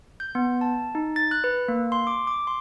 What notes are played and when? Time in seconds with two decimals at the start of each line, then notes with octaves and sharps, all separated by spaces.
0.20 G6
0.35 B3
0.61 A5
0.95 D#4
1.16 A6
1.31 F#6
1.44 B4
1.68 A#3
1.92 C6
2.07 D6
2.27 D6
2.47 C6